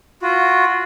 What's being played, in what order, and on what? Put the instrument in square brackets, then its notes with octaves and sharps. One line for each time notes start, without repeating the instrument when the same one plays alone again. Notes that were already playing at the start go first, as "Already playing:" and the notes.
[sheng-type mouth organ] F4 F#4